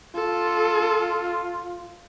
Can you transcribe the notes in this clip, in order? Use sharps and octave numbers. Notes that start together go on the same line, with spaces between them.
F4 A4